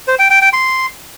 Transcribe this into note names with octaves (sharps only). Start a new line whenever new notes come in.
C5
G5
G5
G5
C6